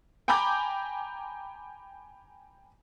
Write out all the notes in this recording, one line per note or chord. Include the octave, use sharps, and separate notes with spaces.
G5 G#5 A#5 B5 D6 G6